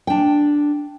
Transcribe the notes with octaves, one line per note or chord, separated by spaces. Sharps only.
D4 G5